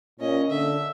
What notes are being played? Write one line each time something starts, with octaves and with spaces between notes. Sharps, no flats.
A#2 C#4 D#5
D3 E5